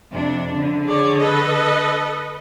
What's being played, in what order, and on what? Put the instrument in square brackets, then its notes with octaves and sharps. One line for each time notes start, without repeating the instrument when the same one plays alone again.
[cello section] F2 C3 D4
D3
[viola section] G#4 C#5 D5
A4 B4 D#5